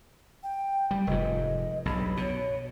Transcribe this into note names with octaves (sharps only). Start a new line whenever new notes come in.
G5
G3
F1 G#2 D#5
B1 G2 B5
B2 C#5